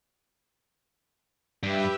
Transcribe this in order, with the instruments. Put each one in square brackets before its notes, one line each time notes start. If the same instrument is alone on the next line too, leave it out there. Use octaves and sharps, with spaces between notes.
[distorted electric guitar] G2 [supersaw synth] G4 B4 E5